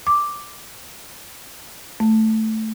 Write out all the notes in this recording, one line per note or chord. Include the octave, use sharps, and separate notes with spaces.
D6
A3